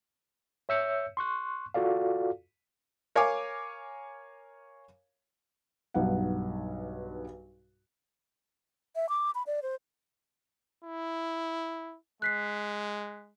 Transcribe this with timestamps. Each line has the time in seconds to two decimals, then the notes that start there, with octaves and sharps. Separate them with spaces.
0.69 C#5 E5 E6 G6 C#7
1.17 C6 C#6 F#6
1.74 F4 F#4 A4 D5 F5
3.15 A#4 C#5 F5 G#5 D6
5.94 B1 G2 D#4 F5 F#5
8.96 E5
9.09 D6
9.35 B5
9.47 D5
9.63 C5
10.84 E4
12.22 G#3 F#6 B6 C7